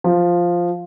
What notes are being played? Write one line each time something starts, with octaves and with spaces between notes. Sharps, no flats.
F3